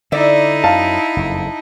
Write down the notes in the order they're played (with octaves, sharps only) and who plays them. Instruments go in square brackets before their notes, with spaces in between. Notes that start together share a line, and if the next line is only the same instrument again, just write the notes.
[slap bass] D3 [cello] D#4 E4 [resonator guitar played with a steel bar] D5 E5
[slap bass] F#2 [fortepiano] F5 A5
[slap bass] F#1 F2